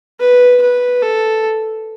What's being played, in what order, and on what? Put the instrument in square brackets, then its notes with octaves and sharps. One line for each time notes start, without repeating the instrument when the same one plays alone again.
[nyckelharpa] B4
B4
A4